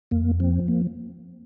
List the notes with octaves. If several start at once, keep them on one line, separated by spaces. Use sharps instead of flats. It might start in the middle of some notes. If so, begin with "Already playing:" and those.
F2 A#3
F3 C4
A#3